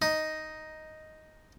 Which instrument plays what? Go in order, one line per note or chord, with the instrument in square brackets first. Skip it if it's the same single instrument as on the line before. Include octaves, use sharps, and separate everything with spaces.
[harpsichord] D#4